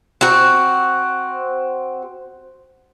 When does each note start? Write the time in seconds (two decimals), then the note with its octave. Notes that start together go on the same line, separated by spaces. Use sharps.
0.21 C4 F#4